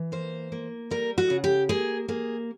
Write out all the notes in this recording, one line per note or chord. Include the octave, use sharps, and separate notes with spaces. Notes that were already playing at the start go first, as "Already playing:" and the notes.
Already playing: E3
A#3 C5
A#3
G3 A#4
F#4
C#3
G4
A#3 G#4
A#3 G#4